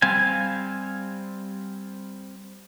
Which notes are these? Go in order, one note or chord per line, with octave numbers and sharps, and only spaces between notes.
G3 C4 F5 G#5